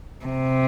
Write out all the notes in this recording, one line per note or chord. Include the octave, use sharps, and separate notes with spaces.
C3